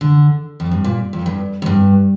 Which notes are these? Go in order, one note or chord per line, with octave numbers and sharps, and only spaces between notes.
D3
F2
G2
A#2
F2
G2
F2
G2